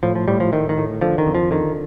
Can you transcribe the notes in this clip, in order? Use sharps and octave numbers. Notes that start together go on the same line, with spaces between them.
A2 F3
F3
A2 G3
F3
A2 D#3
D#3
A2
D3 F3
D#3
F2
F3
D3 D#3